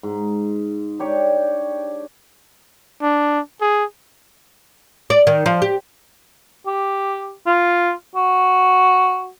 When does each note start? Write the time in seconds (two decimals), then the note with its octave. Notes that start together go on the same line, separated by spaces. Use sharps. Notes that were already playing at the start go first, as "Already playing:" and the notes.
0.03 G#2
0.99 D4 G4 C#5
3.02 D4
3.61 G#4
5.10 D5
5.27 D#3
5.46 F3
5.62 G4
6.67 G4
7.46 F4
8.15 F#4